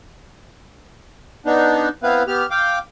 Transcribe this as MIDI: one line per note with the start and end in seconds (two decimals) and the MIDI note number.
1.46 1.89 59
1.46 1.89 62
1.46 1.89 63
2.03 2.23 59
2.03 2.23 60
2.03 2.23 64
2.03 2.23 71
2.03 2.23 77
2.27 2.47 59
2.27 2.47 67
2.27 2.47 89
2.51 2.79 77
2.51 2.79 79
2.51 2.79 86